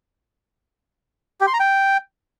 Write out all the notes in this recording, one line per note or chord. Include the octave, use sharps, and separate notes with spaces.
G4
C6
A#5
G5